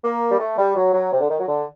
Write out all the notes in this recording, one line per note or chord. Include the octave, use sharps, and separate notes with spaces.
A#3
G3
A3
G3
F#3
F#3
C3
D3
D#3
F#3
D3